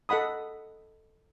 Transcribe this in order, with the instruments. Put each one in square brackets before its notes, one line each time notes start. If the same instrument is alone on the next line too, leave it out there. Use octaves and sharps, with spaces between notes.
[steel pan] A4 D#5 F#5 B5 D#6